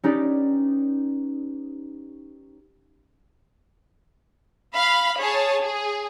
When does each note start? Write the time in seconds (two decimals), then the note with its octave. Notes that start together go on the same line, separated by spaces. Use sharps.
0.04 C#4 D#4 G4 B4 D5
4.74 F5 B5
5.19 G#4 C#5 A5
5.61 G#4